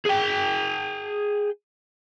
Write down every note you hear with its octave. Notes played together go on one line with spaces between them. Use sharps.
G#4 G5